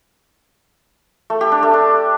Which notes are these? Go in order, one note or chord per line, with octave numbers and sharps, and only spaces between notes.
A3
G4
D4
A3
D4